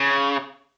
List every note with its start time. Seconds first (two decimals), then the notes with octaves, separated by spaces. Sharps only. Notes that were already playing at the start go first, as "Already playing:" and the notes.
Already playing: C#3